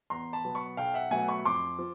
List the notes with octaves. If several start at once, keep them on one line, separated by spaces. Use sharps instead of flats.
E2 A#5 C6
A5 B5
B2 F#3 B3
B5 C#6
B1 F5 G5
E5 F#5
B2 F#3 A3 F#5 G#5
B5 C#6
F2 C6 D6
F3